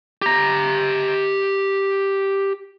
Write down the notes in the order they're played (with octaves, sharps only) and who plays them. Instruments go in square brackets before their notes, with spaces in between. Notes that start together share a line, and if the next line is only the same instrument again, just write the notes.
[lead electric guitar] G4 A#5